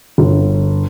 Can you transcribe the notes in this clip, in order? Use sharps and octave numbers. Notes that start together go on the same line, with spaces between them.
G1